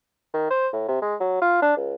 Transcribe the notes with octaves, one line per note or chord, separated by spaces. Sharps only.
D#3
C5
A2
C3
G#3
F#3
F4
D4
C#2